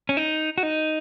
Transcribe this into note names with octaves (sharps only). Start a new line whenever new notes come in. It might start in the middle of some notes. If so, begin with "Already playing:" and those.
C#4
D#4
F#4
D#4